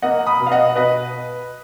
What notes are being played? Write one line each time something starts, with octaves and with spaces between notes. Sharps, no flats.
A#3 D#5 F#5
B5 D#6
B2
F5
D#5 F#5
B2 B4 D#5